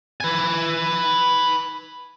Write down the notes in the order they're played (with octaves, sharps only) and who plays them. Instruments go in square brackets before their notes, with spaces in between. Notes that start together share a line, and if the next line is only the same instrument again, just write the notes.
[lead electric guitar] B4 G#5